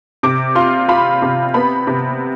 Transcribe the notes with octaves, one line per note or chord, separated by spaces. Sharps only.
C3 D6
F4 C6
F4 B5
C3
B3 B5
C3